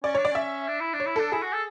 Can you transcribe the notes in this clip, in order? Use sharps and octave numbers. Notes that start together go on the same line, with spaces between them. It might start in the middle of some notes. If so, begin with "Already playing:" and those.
C#4 D5
D4 C#5
D5
C#4 E5
D4
E4
D4
C#5
E4
D4 A4
E4 G#4
F#4
A4